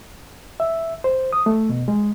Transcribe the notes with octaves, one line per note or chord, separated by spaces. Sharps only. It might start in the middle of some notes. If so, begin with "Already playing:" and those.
E5
C5
D#6
A3
B2
G#3